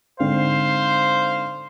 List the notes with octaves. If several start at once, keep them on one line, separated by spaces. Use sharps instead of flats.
G#2 D3 C4 C5 F5